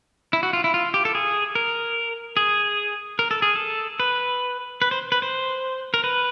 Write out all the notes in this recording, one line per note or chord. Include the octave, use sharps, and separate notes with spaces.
E4
F#4
F4
E4
F4
G4
A4
G#4
A#4
G#4
A#4
A4
G#4
A4
B4
B4
C5
B4
C5
A#4
B4